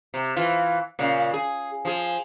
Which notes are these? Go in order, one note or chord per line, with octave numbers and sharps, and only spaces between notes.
C3
E3 F4
A#2 C#3
G#4
F3 G#4